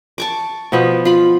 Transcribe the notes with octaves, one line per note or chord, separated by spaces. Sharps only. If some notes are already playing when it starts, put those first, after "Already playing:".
A5 C#6 D6
B2 F3 B3
F4 B5